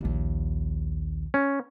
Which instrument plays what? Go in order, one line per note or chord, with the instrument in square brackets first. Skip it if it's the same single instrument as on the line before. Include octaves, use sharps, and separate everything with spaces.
[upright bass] A#1 D#2
[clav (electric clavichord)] C#4